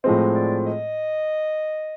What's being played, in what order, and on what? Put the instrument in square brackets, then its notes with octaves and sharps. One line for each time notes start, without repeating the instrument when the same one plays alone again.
[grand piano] A2 F3 G#3 C4 [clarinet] D#5
[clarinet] D5
D#5